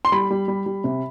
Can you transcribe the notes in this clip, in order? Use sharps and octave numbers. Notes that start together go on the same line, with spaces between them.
C6
G3 B5
G3
G3
G3
C3